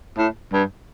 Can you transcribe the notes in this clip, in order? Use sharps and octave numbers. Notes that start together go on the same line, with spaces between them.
A2
G2